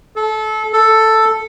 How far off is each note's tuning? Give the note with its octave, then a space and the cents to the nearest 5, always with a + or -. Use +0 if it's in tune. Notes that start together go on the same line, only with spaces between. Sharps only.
A4 -25
A4 +5